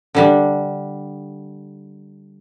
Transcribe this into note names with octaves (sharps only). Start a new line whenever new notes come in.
D3 G3 D4